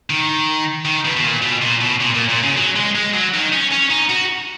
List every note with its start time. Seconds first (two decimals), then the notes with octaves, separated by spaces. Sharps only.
0.10 D#3
0.85 D#3
1.05 B2
1.17 B2
1.24 A#2
1.43 B2
1.62 A#2
1.81 B2
2.00 A#2
2.14 A#2
2.29 A#2
2.43 C#3
2.57 F#3
2.76 G#3
2.96 G#3
3.14 F#3
3.34 D#3
3.53 C#4
3.72 C#4
3.91 D#4
4.10 F#4